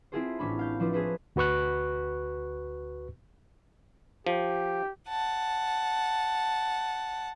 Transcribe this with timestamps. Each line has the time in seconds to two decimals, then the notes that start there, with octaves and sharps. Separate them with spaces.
0.12 C4 E4 F4 G#4 A4 C5
0.39 A1 C#4 D4 B5
0.59 F5 G6
0.80 F3 D4 E4 B4 C5
0.93 C#4 G#4 A4 B4 C5
1.36 D2 F#4 B4 C#6 F#6
4.27 F3 G4
5.09 F#5 A5